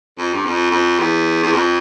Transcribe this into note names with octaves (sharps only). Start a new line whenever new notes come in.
F2
G2
F2
F2
E2
E2
F2